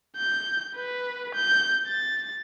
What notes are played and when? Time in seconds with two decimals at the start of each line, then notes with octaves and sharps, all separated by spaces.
0.17 G6
0.76 B4
1.35 G6
1.88 A6